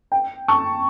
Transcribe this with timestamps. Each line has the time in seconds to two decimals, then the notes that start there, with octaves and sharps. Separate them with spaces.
0.12 G5
0.48 A5 C#6